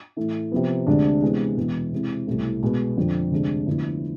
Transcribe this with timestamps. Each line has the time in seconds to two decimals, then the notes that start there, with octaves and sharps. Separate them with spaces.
0.16 A2 E3 A3 E4
0.52 C3 F3 B3
0.87 D2 C3 G#3 D4
1.21 C3 E3 G#3 B3
1.57 E2 B2 G#3 B3 E4
1.92 C3 G#3 C4 E4
2.27 C2 B2 A3 E4
2.63 B2 G#3 B3
2.98 F2 D3 F3
3.31 D2 C3 G#3 D4
3.66 D2 D3 F3 B3 E4